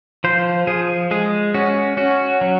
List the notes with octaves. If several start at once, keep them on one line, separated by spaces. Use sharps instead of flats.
F3 C5
F3 G#4
G#3 G#4
C#4 F#4
C#4 F#4
F#3